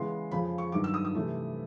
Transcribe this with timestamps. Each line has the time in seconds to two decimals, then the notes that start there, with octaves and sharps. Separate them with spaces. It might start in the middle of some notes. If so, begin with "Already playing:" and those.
Already playing: C#3 E3 G#3 B3 C6
0.31 F2 C#3 F3 B5
0.58 C#6
0.72 G2 D#3 F#3 D6
0.84 E6
0.94 D#6
1.05 D#6
1.15 C3 E3 A3